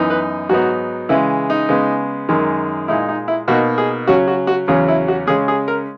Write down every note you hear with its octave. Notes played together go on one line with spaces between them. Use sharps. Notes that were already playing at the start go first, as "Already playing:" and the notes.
Already playing: F#2 E3 B3 D#4
B4
G#2 F#3 B3 D#4 F#4
C#3 E3 G#3 E4
D#4
C#3 G#3 B3
F#2 D#3 G#3
A#2 G#3 D#4 E4
D#4
E4
B2 A#3 D#4 F#4
G#4
C#3 F#3 C#4 F#4
F#4
F#4
E2 C#3 F#3 C#4 G#4
E4
F#4
C#3 G#3 C#4 G#4
G#4
A#4